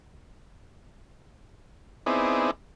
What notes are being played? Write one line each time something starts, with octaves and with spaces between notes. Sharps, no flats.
B3 C4 D#4 E4 G#4 D5